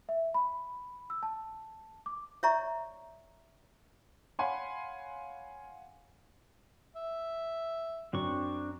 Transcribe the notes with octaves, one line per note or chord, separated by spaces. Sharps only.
E5
B5
E6
A5
D6
C#5 D5 E5 A#5 C#6
C#5 F5 F#5 G#5 B5 C6
E5
F#2 C4 D4 C#6